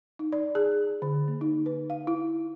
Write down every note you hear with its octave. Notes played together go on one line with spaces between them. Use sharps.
D#4
D5
G#4
D3
A#3
D#4
B4
F5
E4